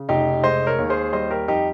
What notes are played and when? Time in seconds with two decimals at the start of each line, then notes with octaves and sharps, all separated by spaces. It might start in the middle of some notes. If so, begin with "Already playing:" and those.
Already playing: C#3
0.09 F1 D#4 G4
0.43 G#3 C5 D#5
0.66 A#4 C#5
0.78 D#2
0.90 G#4 C5
1.13 G3 C5 D#5
1.31 G4 A#4
1.48 F2 D#4 G4